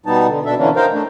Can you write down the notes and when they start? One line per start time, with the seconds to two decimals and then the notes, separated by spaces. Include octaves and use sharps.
0.06 B2 G3 B3 D#4 A5
0.27 D3
0.46 B2 D4 A4 E5
0.58 D3 E3 A#3 C#4 D4
0.76 D#4 A#4 C5 F5 G5
0.92 A3 D4